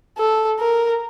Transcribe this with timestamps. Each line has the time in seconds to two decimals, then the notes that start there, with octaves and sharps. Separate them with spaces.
0.18 A4
0.60 A#4